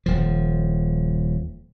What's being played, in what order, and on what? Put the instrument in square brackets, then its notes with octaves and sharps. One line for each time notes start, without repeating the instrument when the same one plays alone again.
[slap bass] D#1 F3